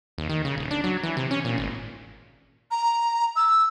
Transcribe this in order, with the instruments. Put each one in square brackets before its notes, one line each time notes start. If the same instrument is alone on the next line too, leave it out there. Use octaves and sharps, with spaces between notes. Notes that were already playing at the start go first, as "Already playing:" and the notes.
[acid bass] D#2
D#3
C#3
D#1
D4
F#3
E3
C3
C#4
A#2
G#1
[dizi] A#5
E6